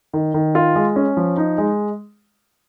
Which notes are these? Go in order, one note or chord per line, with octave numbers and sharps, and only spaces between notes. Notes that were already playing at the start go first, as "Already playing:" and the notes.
D#3
D#3
F4
G#3
C#4
F3
D#4
G#3